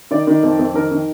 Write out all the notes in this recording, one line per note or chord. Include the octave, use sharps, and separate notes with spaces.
D#3 D5
D#3
F2
F2
D#3 A#4
D#3